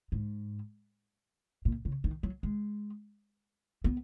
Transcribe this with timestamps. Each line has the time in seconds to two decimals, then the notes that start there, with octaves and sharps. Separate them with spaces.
0.12 G#2
1.65 A#2
1.85 C#3
2.04 D#3
2.23 F#3
2.43 G#3
3.84 B3